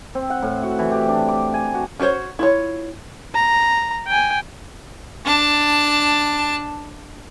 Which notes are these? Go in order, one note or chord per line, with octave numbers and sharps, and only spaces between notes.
C4
F#5
A2
F#4
E3
G4
D4
D6
G#5
F#4
C#4 F#4 G#4 C5 C#5
E4 F4 C#5
A#5
G5 G#5
D4 A5